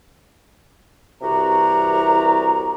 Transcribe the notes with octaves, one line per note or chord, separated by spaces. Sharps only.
C2 C3 E3 F#4 G4 A#5